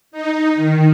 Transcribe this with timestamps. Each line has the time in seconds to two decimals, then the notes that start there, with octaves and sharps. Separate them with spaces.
0.11 D#4
0.55 D#3